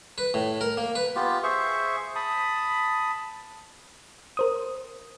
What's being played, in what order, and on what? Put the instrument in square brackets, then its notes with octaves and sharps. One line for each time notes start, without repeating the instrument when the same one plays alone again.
[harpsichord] B4
A2
A#4
A#3
B4
[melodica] B3 F4 G4
G#4 C5 E5 C#6
A5 B5 D#6
[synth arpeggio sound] A#4 C5 D#6